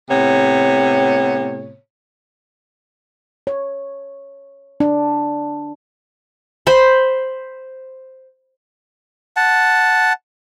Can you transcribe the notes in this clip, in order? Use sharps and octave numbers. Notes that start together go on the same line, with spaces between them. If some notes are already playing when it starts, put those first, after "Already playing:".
A2 C3 B3 C#5
C#5
D4
C5 B5 C6
F#5 A5